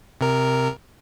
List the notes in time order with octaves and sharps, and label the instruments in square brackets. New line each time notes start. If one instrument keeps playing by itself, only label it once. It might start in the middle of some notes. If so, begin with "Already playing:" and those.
[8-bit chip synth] C3 A#4